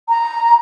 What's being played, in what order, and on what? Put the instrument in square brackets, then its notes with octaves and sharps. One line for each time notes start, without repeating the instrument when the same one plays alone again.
[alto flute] A#5